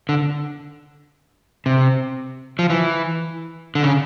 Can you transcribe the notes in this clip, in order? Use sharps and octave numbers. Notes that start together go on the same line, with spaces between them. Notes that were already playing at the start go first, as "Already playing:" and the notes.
D3
C3
F3
E3
D3
C#3